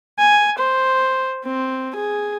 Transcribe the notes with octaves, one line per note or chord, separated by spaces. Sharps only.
G#5
C5
C4
G#4